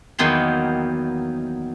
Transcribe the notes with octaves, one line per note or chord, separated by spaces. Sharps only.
E2 D#3 F#3 A#3 B3 C6